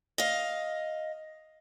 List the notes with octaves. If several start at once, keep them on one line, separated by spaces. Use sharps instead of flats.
D#5 F5